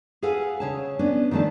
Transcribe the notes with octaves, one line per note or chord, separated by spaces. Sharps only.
G#4 A4 B4 F5 F#5 G#5
C#3 C#5 A5
B3 C#4 D4
D#3 F3 A3 D4 A5